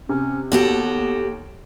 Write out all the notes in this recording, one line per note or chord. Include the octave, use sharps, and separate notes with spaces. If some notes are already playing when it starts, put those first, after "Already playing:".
C3 C#4
D#2 B3 F#4 G4 A4